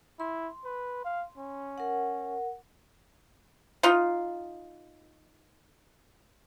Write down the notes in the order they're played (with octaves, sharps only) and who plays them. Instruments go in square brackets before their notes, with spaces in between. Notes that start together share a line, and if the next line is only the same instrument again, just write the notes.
[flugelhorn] E4 [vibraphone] C6
[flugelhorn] B4
F5
C#4
[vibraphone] A#4 F#5
[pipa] D#4 F4